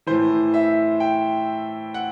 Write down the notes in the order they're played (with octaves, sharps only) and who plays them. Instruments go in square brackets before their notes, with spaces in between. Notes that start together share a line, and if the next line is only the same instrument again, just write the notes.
[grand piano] A2 E3 C5
E5
G5
F#5